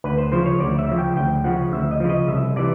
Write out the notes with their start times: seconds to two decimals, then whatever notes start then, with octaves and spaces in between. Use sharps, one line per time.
0.04 D2 B4
0.18 C5
0.32 C#3 F3 C5
0.46 C#5
0.60 D2 D5
0.79 E5
0.88 C#3 F3
0.98 G5
1.16 D2 G5
1.44 C#3 F3 F#5
1.72 D2 E5
1.91 D#5
2.00 C#3 F3
2.09 D#5
2.28 C2 E5
2.56 C3 E3 D5